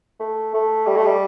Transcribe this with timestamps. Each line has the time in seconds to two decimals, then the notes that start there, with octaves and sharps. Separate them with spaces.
0.20 A3
0.54 A3
0.87 G3
0.97 A3
1.06 G3